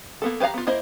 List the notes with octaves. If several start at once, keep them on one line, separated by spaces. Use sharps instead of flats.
A#3 B3 A4
G4 B4 E5 F5 A#5
B3 F4
A#3 E4 C5 D#5